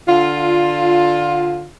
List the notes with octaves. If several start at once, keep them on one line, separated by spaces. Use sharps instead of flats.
D3 F4